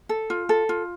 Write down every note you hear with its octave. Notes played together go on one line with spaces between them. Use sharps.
A4
F4
A4
F4